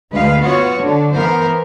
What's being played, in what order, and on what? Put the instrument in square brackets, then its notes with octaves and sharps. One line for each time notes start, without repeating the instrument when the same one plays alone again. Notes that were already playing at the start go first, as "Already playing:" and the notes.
[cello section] D2 G#3 B4 F5
B3 F4 F#4 C#5
D3 D4
E3 B3 A#4 C5